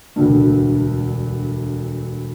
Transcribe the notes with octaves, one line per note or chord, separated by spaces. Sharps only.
E1 D2 G2